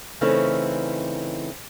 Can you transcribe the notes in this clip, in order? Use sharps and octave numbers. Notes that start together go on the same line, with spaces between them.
C#3 E3 A3 C4 C#4 D#4